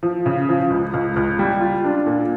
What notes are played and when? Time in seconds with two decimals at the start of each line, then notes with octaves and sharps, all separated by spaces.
0.03 F3
0.26 C#3
0.49 F3
0.70 C#2
0.94 C#2
1.16 C#2
1.39 G3
1.61 F4
1.84 D4
2.06 A#2